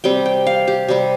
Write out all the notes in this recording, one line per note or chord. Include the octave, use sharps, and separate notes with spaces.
C3 G3 C4 G5
G5
F5
G4
C3 G3 C4